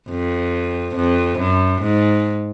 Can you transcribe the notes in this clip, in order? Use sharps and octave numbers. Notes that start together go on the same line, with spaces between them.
F2
F2
F#2
G#2